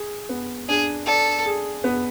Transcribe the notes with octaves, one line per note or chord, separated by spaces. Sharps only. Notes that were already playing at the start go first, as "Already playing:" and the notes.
Already playing: G#4
B3
D4 G#4
A4 D5
G#4
B3